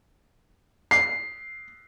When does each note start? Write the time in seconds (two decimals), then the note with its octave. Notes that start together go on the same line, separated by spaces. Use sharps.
0.91 C7